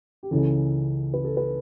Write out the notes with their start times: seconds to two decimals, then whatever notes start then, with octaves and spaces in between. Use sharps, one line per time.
0.23 G4
0.31 C#2 C#3 E3 A4
1.14 B4
1.24 A4
1.37 B4